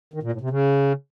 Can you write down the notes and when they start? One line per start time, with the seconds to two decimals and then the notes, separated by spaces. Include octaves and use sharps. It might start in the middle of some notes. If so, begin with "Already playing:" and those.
0.14 D#3
0.23 A#2
0.32 A2
0.41 C3
0.50 C#3